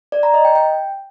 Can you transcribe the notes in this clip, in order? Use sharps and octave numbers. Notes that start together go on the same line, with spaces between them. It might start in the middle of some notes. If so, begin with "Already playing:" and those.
D5
A#5
D#5
G5
G5